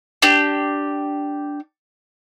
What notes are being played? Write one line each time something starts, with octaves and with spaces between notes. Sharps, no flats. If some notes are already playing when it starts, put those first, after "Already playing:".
D4 G4